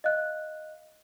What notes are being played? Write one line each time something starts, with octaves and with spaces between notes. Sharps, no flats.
D#5 F5 F#6